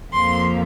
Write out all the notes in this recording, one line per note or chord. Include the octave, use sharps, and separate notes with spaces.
F2 F3 A#3 C6